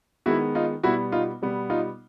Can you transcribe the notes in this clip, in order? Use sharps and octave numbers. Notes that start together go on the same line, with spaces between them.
D#3 G#3 B3 E4 F#4
D#4 F4
B2 G3 B3 E4 F#4
D#4 F4
B2 G3 B3
D#4 F4